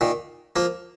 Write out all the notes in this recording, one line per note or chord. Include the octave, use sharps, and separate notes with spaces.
A#2 D#3
F3 A#3